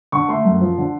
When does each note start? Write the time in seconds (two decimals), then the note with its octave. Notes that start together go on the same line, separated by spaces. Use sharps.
0.12 D3 C#6
0.29 A3 C6
0.45 F#2
0.61 F3
0.78 D3